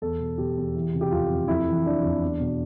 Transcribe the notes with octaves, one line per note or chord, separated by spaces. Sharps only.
E2 A4
B2
B2 G4
E2
E3
C3
G4
F2 F4
F2
F2 E4
E3
E3 D4
F2
E2
B2